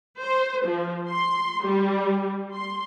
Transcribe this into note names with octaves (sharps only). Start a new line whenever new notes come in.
C5
F3
C6
G3
C6